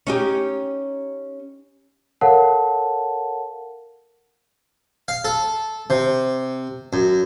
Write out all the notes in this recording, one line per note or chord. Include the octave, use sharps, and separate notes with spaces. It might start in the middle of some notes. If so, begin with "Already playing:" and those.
C#4 D#4 G4
A4 A#4 C#5 F5 F#5 A5
F5
A4
C3
F#2